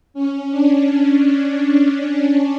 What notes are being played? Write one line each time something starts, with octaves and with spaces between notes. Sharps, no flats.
C#4
D4